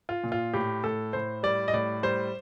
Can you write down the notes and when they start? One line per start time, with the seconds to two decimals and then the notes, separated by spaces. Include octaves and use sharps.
0.09 F4
0.23 A#2
0.32 F4
0.53 A2 G4
0.84 A2 A4
1.13 A2 C5
1.43 G3 D5
1.68 D#5
1.73 A2 D5
2.03 G3 C5